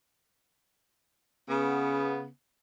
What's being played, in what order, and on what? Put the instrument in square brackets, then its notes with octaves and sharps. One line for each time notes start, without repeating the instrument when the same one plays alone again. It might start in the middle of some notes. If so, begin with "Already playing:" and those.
[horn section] C#3 B3